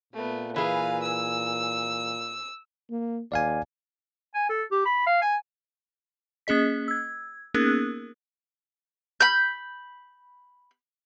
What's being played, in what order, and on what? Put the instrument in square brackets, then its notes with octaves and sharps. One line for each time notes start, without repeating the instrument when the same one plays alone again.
[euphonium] A#2 [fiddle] A3 B3
[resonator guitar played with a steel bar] E3 G#4 [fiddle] B4 F5
[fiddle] E6
[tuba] A#3
[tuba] D#2 [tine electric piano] D5 F5 G#5
[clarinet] G#5
A4
G4
B5
F5
G#5
[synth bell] A#3 C#4 G#4 D#5 B6
E6 G#6
A#3 B3 C#4 D#4 G#4 A#4
[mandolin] B5 G6